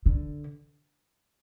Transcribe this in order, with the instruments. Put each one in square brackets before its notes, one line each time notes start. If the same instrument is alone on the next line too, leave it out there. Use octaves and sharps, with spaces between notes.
[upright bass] D3